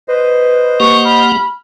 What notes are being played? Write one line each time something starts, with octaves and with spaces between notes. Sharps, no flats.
B4 C5 D#5
A#3 G4 F#5 C#6
B5 F6